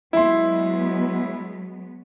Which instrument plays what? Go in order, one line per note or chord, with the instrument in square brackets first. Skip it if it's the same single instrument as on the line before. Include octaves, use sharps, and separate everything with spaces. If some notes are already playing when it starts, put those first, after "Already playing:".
[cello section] F#3 G#3 B3 [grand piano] E4 C6